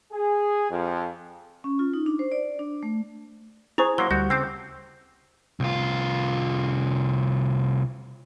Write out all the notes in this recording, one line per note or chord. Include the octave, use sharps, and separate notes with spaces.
G#4
F2
C#4
F4
D#4
D4
C5
D5
D4
A3
E4 G#4 C5 A#5 C#6
F#3 A#3 C6
D2 G3 F#4 G6
C#3 C4 D6 G6 C7
C2 F4